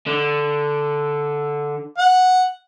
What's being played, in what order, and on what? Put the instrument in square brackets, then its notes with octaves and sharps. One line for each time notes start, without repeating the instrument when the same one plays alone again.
[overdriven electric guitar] D3
[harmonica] F#5